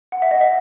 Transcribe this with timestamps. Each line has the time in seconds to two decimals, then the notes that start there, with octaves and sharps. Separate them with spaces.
0.12 F#5
0.22 E5
0.31 D#5
0.41 E5